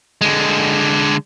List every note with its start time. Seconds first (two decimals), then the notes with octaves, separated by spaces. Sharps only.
0.21 D3 G#3